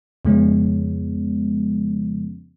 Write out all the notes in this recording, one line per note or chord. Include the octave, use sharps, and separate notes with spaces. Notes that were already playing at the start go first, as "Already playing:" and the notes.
F2 C#3 F3 G#3 B3 C#4